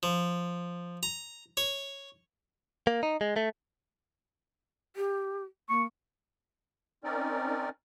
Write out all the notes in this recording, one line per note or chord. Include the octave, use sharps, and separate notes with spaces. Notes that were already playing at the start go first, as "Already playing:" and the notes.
F3
A#5
C#5
A#3
D#4
G#3
A3
G4
A#3 C#6
C4 C#4 D#4 A#4 D5